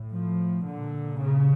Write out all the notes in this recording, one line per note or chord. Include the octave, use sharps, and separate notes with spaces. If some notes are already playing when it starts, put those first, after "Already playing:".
Already playing: A2
F3
A#2 D3
C#3